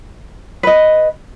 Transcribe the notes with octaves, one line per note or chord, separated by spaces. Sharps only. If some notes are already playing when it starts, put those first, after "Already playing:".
B4 D#5